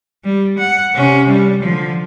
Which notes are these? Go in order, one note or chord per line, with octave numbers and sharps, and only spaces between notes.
G3
F#5
C3 C#4
G3
D3 F3